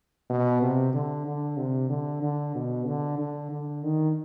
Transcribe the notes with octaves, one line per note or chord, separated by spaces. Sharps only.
B2
C3
D3
D3
C3
D3
D3
B2
D3
D3
D3
D#3